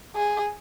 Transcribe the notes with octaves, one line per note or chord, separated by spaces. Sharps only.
G#4